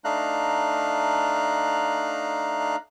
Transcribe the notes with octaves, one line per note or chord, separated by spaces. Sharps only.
A3 D4 D#4 F5 A#5 F#6